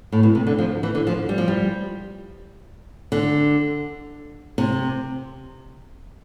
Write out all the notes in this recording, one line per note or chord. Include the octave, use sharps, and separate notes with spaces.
A2
B2
C3
D3
F3
E3
D3
F3
G3
F3
G3
D3
C3